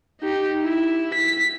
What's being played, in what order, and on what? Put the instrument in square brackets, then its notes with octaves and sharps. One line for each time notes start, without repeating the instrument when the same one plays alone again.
[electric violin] D#4 G4
E4
B6